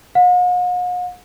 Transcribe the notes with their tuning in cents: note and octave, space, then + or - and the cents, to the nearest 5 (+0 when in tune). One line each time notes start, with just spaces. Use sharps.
F#5 -45